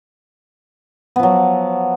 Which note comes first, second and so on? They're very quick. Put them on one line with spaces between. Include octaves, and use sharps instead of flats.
B3 F3 F#3